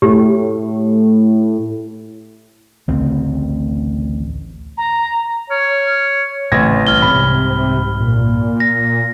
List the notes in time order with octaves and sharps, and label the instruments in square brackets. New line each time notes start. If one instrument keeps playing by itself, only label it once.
[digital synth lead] A2 [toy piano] G4
[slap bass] A1 D2 C#3 C4
[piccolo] A#5
[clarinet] C#5 [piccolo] F6
[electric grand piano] A1 G#6 A#6 [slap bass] A2 C#3 C4 [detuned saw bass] E3
[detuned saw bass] C2 [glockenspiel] F6 G7
[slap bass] C2 G#2 G3 [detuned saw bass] C3 [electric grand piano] B5
[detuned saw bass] A#2
[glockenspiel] A#6